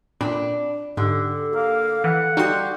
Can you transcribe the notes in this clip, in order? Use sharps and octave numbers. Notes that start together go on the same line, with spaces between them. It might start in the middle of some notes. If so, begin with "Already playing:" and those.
A#2 C4 D4 B5
G#2 D3 G4
A#3 F5
E3 F#5
G3 D#4 F#4 C6